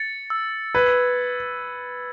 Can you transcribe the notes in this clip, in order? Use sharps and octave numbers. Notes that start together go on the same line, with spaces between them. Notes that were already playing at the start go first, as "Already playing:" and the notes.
Already playing: A6 C#7
E6
B4 G#6